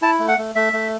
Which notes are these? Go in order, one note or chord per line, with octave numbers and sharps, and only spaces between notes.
E4 A5
A3
F#5
A3
A3 E5
A3